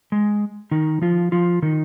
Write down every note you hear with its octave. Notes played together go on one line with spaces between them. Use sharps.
G#3
D#3 D#4
F3 F4
F3 F4
D#3 D#4